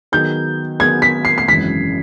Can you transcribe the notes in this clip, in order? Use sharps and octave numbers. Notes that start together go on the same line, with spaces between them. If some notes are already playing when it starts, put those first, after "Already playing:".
D#3 F#3 B3 D#4 G#4 G6
D#3 F#3 B3 D#4 G#4 G#6
B6
C7
C7
G#1 F#2 C#3 E3 B6